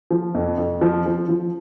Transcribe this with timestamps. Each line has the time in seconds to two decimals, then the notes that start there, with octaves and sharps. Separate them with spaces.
0.11 F3
0.35 F2
0.58 F2
0.81 F3
1.06 F3
1.29 F3